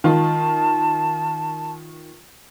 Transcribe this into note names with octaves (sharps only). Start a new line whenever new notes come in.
D#3 F4 A5